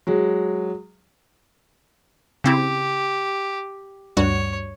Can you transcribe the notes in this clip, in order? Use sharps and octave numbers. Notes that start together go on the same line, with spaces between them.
F#3 G#3
C#3 C4 E4 G4
D2 G2 G3 F#4 C#5